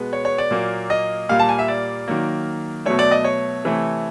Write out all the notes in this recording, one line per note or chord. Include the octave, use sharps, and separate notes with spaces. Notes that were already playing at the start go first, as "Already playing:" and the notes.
Already playing: B2 G#3 B3
C#5
C#5
D5
A#2 F#3 A#3
D#5
A#2 G3 A#3 F5
A5
G#5
E5
D5
D#3 F#3 A#3
B2 F#3 A3 C#5
D5
D#5
C#5
C3 E3 A3